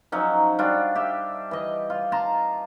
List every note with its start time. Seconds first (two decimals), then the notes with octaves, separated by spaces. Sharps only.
0.12 F3 F#3 C#4 D#4
0.59 G3 D4 F4 F#4
0.95 G4 E5
1.51 E3 D#5
1.90 F4
2.12 A5 A#5 C6